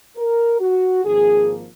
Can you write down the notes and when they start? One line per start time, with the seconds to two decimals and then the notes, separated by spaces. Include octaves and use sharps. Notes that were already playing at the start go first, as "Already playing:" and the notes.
0.16 A#4
0.60 F#4
1.04 G#1 G#2 F3 A#3 G#4